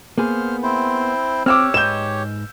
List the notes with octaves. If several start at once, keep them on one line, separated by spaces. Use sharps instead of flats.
A#3 B3 G#4 C5 F6
C4 E4 C5
C4 G4 C#5 D6 E6 F6
G#2 B4 D#5 G6 E7